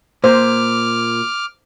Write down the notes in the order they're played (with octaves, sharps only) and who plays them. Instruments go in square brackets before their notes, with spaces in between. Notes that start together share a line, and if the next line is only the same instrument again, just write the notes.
[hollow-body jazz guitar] A#2 [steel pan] C5 [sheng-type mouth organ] D6 F6